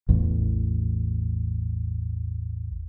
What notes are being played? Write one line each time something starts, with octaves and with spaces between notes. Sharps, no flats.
A1 E2